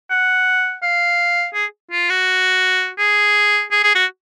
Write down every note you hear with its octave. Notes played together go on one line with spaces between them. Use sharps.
F#5
F5
G#4
F4
F#4
G#4
G#4
G#4
F#4